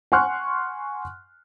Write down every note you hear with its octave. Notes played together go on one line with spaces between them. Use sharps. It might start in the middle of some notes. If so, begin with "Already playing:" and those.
F#5 G#5 C6 C#6 F6 F#6